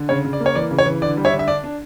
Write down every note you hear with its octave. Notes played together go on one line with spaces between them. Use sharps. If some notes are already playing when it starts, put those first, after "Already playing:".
Already playing: D3
C#3 C#5
C#3
D5
A#3
C#5
E3 D5
C#3
C#5
E3
D3 D5
G3
C#5 E5
D3
E5
D4 D5
D4